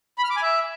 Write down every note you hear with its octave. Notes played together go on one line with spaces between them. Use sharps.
B5
F6
D6
G#5
E5